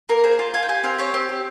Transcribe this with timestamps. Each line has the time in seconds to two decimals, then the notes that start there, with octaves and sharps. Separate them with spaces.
0.09 A#3 A#4
0.23 G#4 C5
0.39 F4
0.54 F4 G#5
0.63 G5
0.69 G4 G#5
0.84 C4 F5
0.98 G4 C#5
1.14 C4
1.29 G4